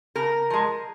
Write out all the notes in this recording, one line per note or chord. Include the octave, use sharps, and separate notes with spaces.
C#3 A#4
F3 G#3